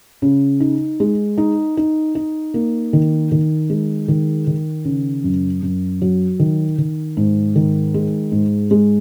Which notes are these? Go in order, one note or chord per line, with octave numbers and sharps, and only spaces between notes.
C#3
D#4
G#3
D#4
D#4
D#4
A#3
D#3
D#3
G#3
D#3
D#3
C#3
F#2
F#2
F#3
D#3
D#3
G#2
D#3
G#3
G#2
G#3